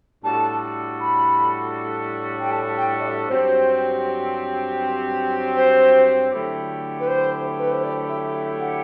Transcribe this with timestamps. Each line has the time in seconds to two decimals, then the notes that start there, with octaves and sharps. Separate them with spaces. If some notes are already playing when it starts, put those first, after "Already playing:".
0.24 A2 G3 D4 F#4 A4 A5
1.00 B5
2.40 G5
2.51 A5
2.77 G5
2.98 D5
3.02 E5
3.27 G2 F#3 C4 G4 C5
5.56 C5
6.32 D3 F#3 A3 E4 G4
7.00 B4
7.07 C5
7.58 B4
7.71 C5
7.84 D5
8.09 E5
8.35 E5
8.60 F#5